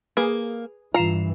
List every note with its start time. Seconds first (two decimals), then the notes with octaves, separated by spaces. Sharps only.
0.17 A#3 G#4 B4
0.94 G2 E3 F4 A#5 C7 E7